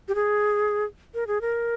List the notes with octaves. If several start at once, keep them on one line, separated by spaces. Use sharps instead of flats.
G4
G#4
A#4
G#4
A#4